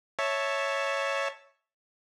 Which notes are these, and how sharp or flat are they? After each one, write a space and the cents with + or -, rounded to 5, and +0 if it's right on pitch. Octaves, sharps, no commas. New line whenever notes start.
C#5 +0 E5 -5 A5 +0